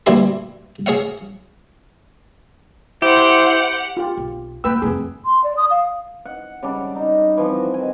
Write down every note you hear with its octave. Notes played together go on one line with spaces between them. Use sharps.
D2 A#2 E3 G3 E4 C6
G#4 C#5 F5 F#5
E4 G4 C5 F#5
F4 G4
B1
D2 A#3 B4 G5 E6
D1 F2 G#4
C6
D5
D#6
F5
F#5
C#3 G3 D4
D#4
E3 F3 C4
F#4
D#3 G#5